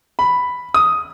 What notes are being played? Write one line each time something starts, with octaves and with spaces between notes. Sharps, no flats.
B5
D#6